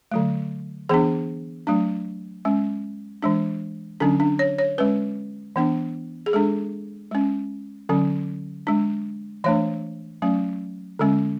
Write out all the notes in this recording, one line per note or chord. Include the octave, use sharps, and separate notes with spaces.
D3 F#3 A3
E3 B3 D4 G#4
F#3 A3 D4
G#3 C#4
E3 G#3 D4
D3 F#3 C#4 D4
D4
C#5
C#5
G#3 C#4 B4
E3 B3 D4
G#4
G#3 D4 A4
G#3 C#4
D3 F#3 C#4
G#3 D4
E3 A3 D4 C#5
F#3 A3 C#4
D3 G#3 C#4